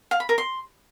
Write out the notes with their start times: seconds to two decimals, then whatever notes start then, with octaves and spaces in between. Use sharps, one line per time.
0.11 F5
0.20 B5
0.29 A#4
0.38 C6